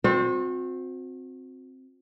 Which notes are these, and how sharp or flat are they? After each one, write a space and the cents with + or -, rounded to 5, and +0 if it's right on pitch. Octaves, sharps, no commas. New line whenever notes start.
C4 +0 F#4 -40 C5 +0